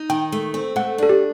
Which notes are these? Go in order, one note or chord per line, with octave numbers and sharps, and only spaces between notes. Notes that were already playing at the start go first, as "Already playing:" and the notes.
Already playing: D#4
D#3 G5
A3
C4
A3 F#5
D4 A4
G4